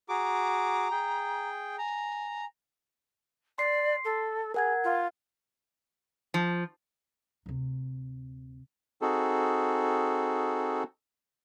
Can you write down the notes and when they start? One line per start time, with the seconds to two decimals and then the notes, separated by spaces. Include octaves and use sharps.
0.09 F#4 G#4 A#5 D6
0.91 G#4 G5
1.78 G#5 A#5
3.58 D5 C6 C7
4.05 A4
4.54 G#4 A#4 F#5 G#6
4.84 F4
6.34 F3
7.46 D2 C3
9.02 C4 D#4 F#4 G#4 A4